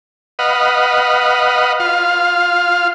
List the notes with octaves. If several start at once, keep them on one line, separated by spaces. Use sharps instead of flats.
B4 D#5 F5 F#5
F4 F5